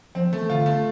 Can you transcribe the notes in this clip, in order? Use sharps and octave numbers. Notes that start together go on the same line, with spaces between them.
F3 C4
E3 A3
D3 F4
A3